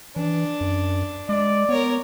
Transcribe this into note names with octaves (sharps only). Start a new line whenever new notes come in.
E3 D4
F#2
G#3 D5
B3 A#4 C#5